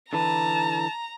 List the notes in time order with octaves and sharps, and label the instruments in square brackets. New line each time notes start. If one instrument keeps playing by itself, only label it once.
[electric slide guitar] D3 E3 B4 [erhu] A5 [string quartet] A#5